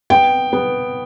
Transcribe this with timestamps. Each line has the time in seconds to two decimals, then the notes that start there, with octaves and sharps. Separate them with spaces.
0.10 B3 G5
0.53 B3